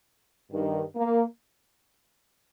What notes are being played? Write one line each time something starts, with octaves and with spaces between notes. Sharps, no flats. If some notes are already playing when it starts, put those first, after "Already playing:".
G2 D#3
A#3